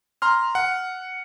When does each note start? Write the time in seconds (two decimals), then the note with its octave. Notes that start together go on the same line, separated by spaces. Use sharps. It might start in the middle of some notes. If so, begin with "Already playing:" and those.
0.22 A#5 C6 F6
0.55 F#5